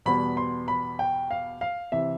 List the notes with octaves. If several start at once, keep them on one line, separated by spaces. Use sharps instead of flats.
E2 B2 G3 B3 B5
C6
B5
G5
F5
F5
C3 E3 E5